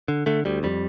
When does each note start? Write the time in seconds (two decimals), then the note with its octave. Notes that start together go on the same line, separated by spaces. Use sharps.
0.08 D3
0.26 D3 A3
0.45 D2 G3
0.63 F2 G3